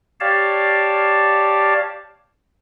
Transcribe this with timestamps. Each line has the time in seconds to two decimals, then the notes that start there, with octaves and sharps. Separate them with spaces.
0.20 G4 C#5 D5 F5 A5